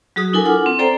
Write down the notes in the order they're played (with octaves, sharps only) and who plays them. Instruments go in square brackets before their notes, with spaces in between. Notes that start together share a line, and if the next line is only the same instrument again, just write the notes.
[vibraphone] F#3 F#4 G#4 D#6
D4 E4 A4 A#4 G#5
F4 F#5 D6
C4
A4 C5 D5 G5 A#5